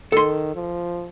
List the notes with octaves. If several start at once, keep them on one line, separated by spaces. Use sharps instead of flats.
D#3 A4 C6
F3